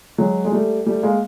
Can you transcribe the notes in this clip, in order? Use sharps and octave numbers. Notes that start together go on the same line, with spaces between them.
F#3 G#3
G#3
G3 A3
G3 A3
G#3 A#3